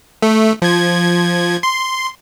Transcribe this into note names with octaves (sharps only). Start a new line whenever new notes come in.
A3
F3 G#6
C6